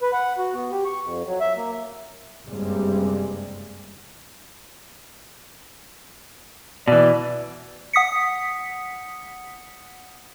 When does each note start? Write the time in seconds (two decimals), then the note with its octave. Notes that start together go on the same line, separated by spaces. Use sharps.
0.01 B4
0.13 F#5
0.38 F#4
0.54 B3
0.72 G4
0.85 C#6
1.04 F2
1.27 F#3
1.41 E5
1.57 A#3
2.47 F#1 G2 C3 G3 G#3
6.88 B2 E3 D5
7.93 F#5 D#6 B6 C#7